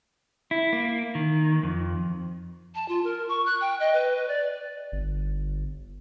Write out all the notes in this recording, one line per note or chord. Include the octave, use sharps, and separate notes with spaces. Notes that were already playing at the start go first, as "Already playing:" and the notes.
E4
A#3
D#3
F2
A5
F4
A#4
C#6
F#6
G5
D#5
B4
B4
D5
G1